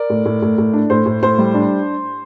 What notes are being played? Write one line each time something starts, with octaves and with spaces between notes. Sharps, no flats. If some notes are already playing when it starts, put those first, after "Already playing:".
Already playing: A#4 D5
A2
A2
A2
A2
D4
A2 C5
A2
A2 C5
G3
D4